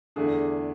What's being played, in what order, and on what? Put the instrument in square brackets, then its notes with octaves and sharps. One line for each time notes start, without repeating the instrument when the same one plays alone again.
[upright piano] E2 D3 A3 D4 G#4